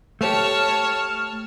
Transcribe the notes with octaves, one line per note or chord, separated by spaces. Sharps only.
A3 G4 C#5 A5 F6